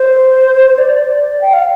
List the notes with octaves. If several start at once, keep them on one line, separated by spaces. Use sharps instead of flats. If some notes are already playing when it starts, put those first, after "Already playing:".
Already playing: C5
D5
G5
F5